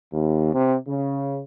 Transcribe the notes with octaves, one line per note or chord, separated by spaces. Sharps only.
D#2
C3
C#3